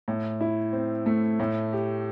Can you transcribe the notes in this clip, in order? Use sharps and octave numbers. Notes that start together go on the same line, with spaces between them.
A2
E4
C4
A3
A2
G4